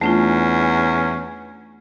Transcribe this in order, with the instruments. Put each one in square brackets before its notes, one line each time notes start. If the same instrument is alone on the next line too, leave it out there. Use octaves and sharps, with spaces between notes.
[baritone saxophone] E2 [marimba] A3 D4 F4 [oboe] C#4